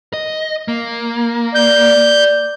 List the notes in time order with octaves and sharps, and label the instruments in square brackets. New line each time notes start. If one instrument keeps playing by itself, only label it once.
[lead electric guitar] D#5
A#3
[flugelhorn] D5 [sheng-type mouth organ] G6